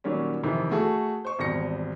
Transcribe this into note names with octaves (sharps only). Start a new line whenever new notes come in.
A#2 D#3 F#3 G3 C#4
F2 C3 D#3 E3
A3 F#4 G#4 A4
C5 C#6
G#1 E2 G3 A#6 C#7